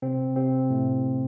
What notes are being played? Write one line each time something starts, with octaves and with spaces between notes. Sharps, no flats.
C3 C4
C3 C4
A2 A3